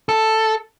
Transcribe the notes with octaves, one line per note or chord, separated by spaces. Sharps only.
A4